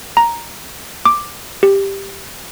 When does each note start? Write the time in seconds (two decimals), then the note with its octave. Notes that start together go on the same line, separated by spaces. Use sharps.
0.17 A#5
1.05 D6
1.63 G4